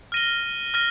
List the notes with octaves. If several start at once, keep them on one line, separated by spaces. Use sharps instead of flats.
F6 A#6 D#7 G7
F6 A#6 D#7 G7